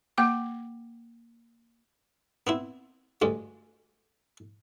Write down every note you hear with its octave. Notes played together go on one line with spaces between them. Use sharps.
A#3 G5 D6
B3 C4 E4
D2 G2 G#3